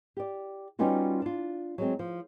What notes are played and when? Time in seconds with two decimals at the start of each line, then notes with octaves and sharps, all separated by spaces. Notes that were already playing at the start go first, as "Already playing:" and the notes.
0.17 G4 D5
0.79 G3 B3 C#4 D#4 F4 F#4
1.22 D4 F4
1.78 F#3 G#3 C4
1.99 F3